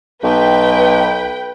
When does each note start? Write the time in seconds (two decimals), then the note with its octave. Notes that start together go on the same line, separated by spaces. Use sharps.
0.23 B1 B4 G5